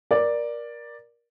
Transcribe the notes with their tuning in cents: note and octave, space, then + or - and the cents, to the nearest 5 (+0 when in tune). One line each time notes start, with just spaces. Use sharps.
A#4 +20 D5 +5